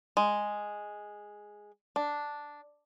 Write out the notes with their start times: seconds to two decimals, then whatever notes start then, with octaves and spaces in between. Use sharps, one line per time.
0.17 G#3
1.96 D4